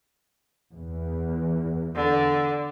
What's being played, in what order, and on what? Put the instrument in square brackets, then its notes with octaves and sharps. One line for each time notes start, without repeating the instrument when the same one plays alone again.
[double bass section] E2
[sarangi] D3